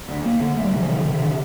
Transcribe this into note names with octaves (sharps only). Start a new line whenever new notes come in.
D2
D2 A#3
D3
D2 A3
G3
C3
F3
C3 D#3
C3 D#3
D3